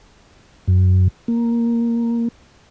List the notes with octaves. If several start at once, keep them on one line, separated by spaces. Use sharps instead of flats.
F#2
A#3